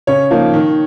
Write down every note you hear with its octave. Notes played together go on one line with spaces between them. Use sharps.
C#3 C#5
F3 A#3 D#4
D#3